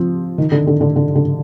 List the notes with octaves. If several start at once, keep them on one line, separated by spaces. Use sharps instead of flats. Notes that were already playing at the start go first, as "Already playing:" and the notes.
Already playing: F3 C4
D#3
D3
D3
D3
D3
D3